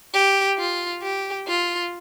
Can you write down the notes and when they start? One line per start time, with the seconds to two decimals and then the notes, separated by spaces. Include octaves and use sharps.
0.14 G4
0.58 F4
1.02 G4
1.48 F4